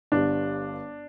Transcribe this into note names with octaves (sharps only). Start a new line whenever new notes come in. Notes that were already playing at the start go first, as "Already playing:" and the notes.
G1 G2 G3 D4